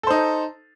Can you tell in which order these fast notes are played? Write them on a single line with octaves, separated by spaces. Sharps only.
A4 C5 D#4